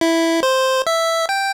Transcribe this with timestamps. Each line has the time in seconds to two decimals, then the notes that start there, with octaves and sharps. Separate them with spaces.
0.01 E4
0.43 C5
0.87 E5
1.29 G5